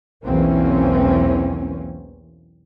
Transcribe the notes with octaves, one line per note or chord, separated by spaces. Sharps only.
B1 E2 E3 A#3 C4 C#4